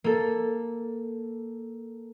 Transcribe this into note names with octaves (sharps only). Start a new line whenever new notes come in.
A#3 A4